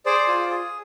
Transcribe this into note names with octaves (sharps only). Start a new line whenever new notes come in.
G#4 C5 D5
F4
G#4